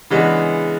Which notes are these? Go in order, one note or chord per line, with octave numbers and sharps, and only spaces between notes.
C#3 E3 G#3 B3 D4